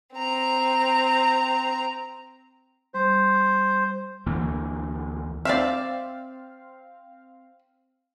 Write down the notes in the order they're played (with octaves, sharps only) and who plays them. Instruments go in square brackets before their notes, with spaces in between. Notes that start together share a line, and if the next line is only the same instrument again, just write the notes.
[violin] C4 A#5
[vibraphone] G3 [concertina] C5
[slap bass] D2 E3 A#3
[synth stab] C4 F5 [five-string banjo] D5 E5